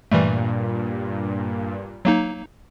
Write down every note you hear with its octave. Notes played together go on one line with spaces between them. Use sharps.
G2 A#2 E3 G3 A3
F#3 A#3 D#4